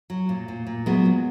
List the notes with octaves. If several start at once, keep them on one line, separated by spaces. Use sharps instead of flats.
F#3
A#2
A#2
A#2
F#3 G#3 B3
A#2